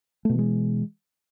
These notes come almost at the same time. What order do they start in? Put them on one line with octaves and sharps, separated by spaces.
A3 B2 E3 G#3